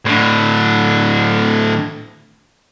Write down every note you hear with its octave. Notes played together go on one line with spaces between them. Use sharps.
A2 D3